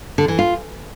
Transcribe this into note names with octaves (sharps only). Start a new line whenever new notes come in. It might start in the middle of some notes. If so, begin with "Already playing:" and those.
D3
E3
F4